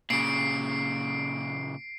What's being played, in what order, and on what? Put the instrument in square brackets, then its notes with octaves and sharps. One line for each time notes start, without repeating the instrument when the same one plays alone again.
[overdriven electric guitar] A#2 C#3 [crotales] C7 D7